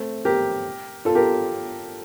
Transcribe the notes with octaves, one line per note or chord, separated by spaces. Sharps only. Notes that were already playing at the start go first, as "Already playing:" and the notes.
Already playing: A3 C4
G4 A#4
F4 A4
G4 A#4